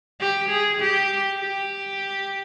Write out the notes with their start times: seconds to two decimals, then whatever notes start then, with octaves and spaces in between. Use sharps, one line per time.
0.20 G4
0.49 G#4
0.80 G4
1.39 G4